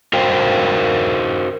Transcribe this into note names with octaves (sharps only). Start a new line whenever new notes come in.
F#4 A#4 C5 F5 G5